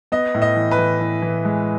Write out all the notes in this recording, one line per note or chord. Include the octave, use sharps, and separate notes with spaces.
B3 D#5
A2
D#5
E3
B4
E3
E3
E3
G#3